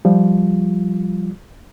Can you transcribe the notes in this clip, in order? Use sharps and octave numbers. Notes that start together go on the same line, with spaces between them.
F3 G3 F4